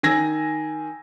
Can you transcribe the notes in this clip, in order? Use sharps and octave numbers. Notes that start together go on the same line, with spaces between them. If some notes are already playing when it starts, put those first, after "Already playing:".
D#3 G#5 E6 G#6 A#6